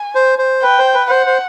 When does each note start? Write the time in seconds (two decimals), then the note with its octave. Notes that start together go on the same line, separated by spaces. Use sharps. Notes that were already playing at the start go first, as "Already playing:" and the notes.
Already playing: G#5
0.15 C5
0.39 C5
0.63 B4 G5
0.78 C5
0.94 B4
1.10 C5 F#5
1.26 C5